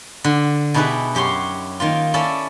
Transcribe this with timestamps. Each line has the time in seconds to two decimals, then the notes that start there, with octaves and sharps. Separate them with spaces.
0.24 D3
0.74 B2 D#4 E4 G4 G#4 B4
1.15 F#2 G4 C#5 C6
1.80 D#3 A#3 F4
2.14 C#4 E4 A4 D5 F5 A5